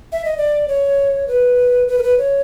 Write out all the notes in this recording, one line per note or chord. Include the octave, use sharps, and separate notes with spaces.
E5
D#5
D5
C#5
B4
B4
A#4
B4
C#5